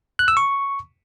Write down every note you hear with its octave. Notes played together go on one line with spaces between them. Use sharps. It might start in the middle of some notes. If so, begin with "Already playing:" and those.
F#6
E6
C#6